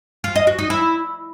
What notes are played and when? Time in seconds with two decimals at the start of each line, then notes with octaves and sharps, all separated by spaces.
0.24 F4
0.35 D#5
0.47 F#4
0.59 D#4
0.70 E4